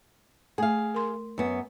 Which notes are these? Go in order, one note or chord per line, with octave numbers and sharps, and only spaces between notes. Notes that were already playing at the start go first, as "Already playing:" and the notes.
A3 G#4 F5
A#4 C6
F#2 B3